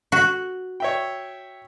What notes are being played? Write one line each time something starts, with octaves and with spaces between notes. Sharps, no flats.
F#4
C#5 E5 G5